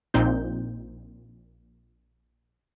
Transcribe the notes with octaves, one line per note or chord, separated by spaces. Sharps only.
A#1 A#2 C4 D#4 G6